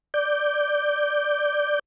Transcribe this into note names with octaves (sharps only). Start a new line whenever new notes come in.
D5 G6